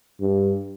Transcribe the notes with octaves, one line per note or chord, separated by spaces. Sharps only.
G2